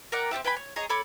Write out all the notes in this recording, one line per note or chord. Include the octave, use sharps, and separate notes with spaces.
A#4 D5 F#5 G5
C4 F4 G4 E5
B4 G5 G#5 B5
C#5
G#4 C#5 D#5 A#5
A4 C#5 B5 D6